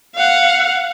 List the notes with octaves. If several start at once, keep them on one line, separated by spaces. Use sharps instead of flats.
F5 F#5